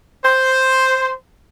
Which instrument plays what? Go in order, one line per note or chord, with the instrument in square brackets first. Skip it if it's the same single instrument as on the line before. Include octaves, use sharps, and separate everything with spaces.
[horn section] C5